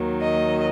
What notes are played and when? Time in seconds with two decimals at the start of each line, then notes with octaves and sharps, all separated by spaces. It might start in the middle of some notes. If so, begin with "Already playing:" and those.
Already playing: D#2 D#3 F#3
0.21 D#5